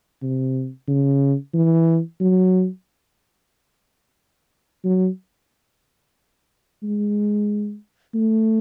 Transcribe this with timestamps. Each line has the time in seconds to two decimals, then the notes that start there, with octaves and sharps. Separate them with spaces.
0.23 C3
0.88 C#3
1.54 E3
2.21 F#3
4.85 F#3
6.83 G#3
8.15 A3